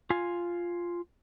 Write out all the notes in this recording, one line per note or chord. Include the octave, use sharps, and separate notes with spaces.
F4 G#5